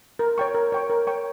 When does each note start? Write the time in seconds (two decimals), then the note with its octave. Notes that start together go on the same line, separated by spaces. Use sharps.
0.19 A#4
0.38 C#5 G5 C#6
0.54 A#4
0.72 C#5 G5 C#6
0.90 A#4
1.07 C#5 G5 C#6